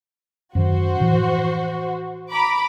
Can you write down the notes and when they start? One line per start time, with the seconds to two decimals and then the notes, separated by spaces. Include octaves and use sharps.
0.55 F#2 D#3 F#4 C5
1.00 A2 E3 F3
2.31 A#5 B5 D6